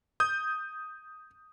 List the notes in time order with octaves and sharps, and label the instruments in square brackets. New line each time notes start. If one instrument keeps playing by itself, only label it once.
[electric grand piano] D#6 G6